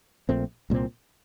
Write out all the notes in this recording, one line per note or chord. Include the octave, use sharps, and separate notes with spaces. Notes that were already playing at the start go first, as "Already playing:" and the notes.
A#1 A#2 A3 C4
C2 A#2 G3 C4